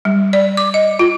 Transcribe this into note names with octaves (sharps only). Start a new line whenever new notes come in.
G3
D5
D6
D#5
F4